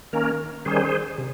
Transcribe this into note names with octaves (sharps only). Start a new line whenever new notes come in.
D#3 A#3 C#4 A#4
D#3 G3 C#4 G#4 C5
C3